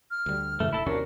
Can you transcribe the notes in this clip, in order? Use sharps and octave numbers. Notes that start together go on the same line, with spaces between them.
F6
D2 G3
F#2 C#3 E3 A3
E1 E4 A4
D#2 C3 C#4 D4 F#4 A#4